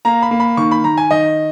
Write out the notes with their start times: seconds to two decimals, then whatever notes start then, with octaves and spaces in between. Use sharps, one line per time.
0.05 A#3 A#5
0.22 B5
0.31 A#3
0.40 B5
0.57 D#3 C#6
0.71 B5
0.84 D#3 A#5
0.98 G#5
1.11 D#3 D#5